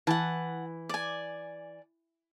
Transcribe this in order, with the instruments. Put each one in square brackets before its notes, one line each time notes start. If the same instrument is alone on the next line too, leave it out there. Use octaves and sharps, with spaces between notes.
[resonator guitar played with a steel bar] E3 [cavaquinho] F#5 A5
[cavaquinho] D5 G#5